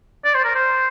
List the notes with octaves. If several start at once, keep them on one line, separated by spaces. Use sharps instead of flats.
D5
C5
A#4
C5